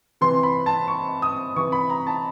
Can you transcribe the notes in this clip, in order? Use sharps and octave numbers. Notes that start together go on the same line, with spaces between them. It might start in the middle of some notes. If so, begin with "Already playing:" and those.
C3 E3 C6
B5
A5
C#6
D#6
C3 E3 C#6
B5
A#5
A5